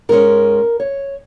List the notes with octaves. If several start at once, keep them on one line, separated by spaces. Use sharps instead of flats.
G#2 G#3 C#4 A#4
C#5